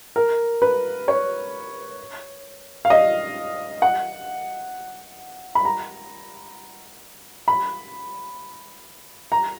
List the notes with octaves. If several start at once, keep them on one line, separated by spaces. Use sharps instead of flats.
A#4
B4
C#5
F5
D#5
F#5
B5
A#5
B5
A#5